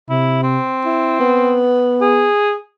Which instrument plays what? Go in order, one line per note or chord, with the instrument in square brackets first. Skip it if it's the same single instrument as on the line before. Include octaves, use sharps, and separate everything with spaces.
[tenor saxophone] C3 [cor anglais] E4
[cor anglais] C4
[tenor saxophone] E4
B3
[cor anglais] G#4